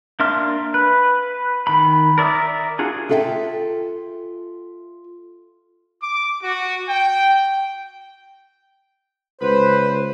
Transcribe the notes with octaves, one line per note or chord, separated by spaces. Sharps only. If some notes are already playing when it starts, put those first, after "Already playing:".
A#3 D4 E5 C6 F6
B4
D#3 B5
A#4 D5 E5 A#5 D#6
D4 F4 F#4 G#4
F4 G#4 A4 E5 F#5 G5
D6
F#4
G5
C#2 B4 C5